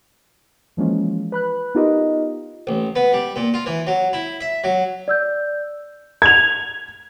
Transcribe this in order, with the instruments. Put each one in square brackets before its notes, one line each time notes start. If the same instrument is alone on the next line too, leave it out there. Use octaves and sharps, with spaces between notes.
[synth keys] E3 F3 G#3 A#3 C#4 F4
B4 B5 F#6
B3 D#4 F4 G4 A#4 D#5
[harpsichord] A1
B3
G3
A#2
F4
E3
F#3
E4
E5
F#3
[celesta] D5 E6 G6
[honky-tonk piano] G#6 F7